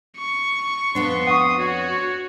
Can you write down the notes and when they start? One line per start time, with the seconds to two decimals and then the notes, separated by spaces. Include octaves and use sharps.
0.17 C#6
0.95 F2 B3 D4 C6
1.27 F#5 C#6 D#6
1.59 F#4 C#5